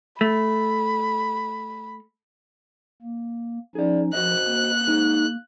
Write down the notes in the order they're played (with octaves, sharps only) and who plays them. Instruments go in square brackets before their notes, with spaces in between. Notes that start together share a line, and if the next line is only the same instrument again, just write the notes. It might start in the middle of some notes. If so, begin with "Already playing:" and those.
[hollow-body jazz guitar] A3 [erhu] B5
[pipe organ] A#3
[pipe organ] F3 C#4 D#4 [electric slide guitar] G#4 D5
[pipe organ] F3 [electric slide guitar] F#4 C5 D#5 [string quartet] F#6
[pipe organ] A#3
[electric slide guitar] D#4 G#4 D#5